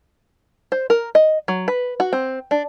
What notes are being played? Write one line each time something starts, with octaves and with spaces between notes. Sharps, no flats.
C5
A#4
D#5
F#3
B4
F#4
C4
D4